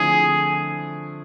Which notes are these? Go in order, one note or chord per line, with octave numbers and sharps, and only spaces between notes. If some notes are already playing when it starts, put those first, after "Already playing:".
Already playing: D3 F3 A3 C4 E4 G#4